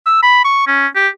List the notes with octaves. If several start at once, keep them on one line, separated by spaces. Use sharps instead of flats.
E6
B5
C#6
C#4
G4